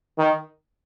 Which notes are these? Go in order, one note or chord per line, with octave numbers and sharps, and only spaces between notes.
D#3